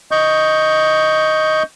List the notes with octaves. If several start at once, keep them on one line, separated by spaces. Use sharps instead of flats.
D#5 C#6 G6